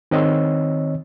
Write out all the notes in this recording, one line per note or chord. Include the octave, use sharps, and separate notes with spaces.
D#3 C4 C#5 D#5 E6